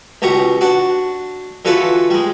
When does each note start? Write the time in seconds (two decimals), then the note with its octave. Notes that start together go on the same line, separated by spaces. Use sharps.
0.22 C#2 B2 G4 A#5 C#6
0.61 D4 F#4
1.65 D3 E3 F4 F#4 A4 B4
2.10 G3 G#3